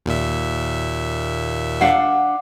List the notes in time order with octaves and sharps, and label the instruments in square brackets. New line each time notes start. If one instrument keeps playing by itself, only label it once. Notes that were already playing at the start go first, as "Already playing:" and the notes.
[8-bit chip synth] D#2 A#2 E5
[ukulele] D4 F5 F#5